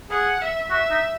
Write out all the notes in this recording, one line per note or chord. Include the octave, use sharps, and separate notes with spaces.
G#4 F#5
E5
F#4 E5
D#4